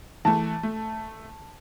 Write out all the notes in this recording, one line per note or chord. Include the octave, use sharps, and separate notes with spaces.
E3 A3 A5
A3